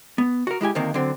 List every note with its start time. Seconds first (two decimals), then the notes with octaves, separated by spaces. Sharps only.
0.18 B3
0.47 F#4 A#4
0.61 G#3 E4 G4 G#5
0.75 D2 C3 D#3 A#3
0.94 D3 F#3 C4